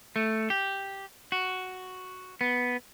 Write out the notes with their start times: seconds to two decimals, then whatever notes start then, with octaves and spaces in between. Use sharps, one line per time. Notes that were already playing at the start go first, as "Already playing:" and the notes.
0.16 A3
0.50 G4
1.32 F#4
2.41 B3